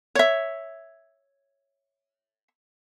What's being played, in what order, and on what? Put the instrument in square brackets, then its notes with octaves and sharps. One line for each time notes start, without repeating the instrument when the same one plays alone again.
[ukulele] C#5 E5